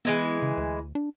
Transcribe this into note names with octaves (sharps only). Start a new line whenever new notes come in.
E3 G#3 B3 E4
C#3
D2
D4